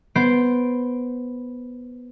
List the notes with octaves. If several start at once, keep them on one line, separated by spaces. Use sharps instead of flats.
B3 C5 D7